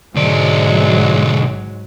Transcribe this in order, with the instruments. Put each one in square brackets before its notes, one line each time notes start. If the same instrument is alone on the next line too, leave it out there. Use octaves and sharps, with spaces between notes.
[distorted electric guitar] B1 D5 [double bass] G#2 F#3 [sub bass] D3 [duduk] G#3